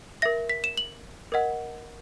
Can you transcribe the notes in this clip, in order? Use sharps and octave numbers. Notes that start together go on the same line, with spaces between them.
A#4 E5 A#6
B6
E7
F#7
A#4 D#5 F#5